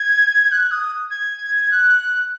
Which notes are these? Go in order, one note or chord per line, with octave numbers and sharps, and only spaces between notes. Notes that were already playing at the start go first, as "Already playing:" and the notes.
Already playing: G#6
F#6
D#6
G#6
F#6